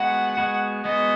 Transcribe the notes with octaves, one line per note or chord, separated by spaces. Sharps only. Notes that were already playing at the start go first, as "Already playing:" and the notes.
Already playing: G#3 B3 F#4 F#5
G#3 B3 F#4
G#3 B3 F#4 D#5